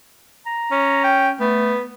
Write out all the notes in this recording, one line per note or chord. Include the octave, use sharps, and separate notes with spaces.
A#5
C#4
G5
A3 B3